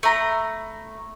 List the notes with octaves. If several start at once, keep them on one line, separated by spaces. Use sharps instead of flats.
A3 A#5 B5